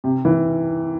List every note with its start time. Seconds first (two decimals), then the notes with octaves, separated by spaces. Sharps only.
0.04 C3
0.25 E3